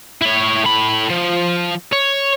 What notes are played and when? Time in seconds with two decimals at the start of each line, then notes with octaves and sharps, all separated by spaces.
0.22 E4 C#5
0.64 A2 B5
1.10 F3
1.92 C#5